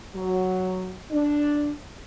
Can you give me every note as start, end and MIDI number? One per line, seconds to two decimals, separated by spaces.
0.15 0.93 54
1.11 1.71 62